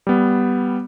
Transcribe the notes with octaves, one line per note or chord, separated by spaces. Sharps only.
G3 B3